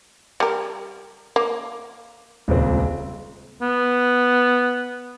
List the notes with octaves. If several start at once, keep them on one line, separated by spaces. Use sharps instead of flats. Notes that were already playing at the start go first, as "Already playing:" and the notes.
G3 A#4
A#3
D#1 C#2 C4
B3